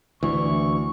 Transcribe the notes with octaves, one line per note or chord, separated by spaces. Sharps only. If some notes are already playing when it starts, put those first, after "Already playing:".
D2 E3 C#6